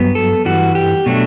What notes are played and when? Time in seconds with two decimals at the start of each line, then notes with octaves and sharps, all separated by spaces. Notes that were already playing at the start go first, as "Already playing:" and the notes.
Already playing: G2 F#3 B3
0.15 A4
0.45 G2 E3 G3 F#4
0.75 G4
1.06 B2 F#3 A3 D4